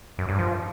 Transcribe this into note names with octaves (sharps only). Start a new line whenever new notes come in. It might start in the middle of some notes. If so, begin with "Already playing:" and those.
F#2
G2
F3